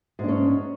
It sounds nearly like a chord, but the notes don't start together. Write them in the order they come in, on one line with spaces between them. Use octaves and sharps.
G#2 D4 C#4